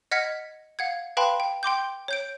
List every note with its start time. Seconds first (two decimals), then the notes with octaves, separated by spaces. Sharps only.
0.11 D#5 F#5 F6 G#6 B6 C#7
0.79 F5 F#5 G#6
1.17 B4 F5 G5 A5 B5 C6
1.40 G5
1.63 G5 C6 D6 G6
2.08 C#5 G6 D7